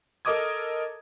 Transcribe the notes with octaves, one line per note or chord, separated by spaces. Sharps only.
A4 A#4 D#5 D6 D#6 G#6